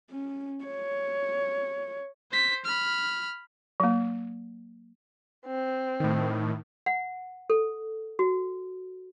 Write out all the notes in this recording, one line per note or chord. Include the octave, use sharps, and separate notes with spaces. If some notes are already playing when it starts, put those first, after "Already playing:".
C#4
C#5
C5 B6
B5 F6
F#3 A#3
C4
A2 D#3
F#5
A4
F#4